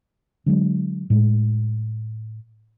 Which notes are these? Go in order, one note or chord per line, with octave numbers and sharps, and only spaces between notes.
D3 F#3 G#3
A2 G#3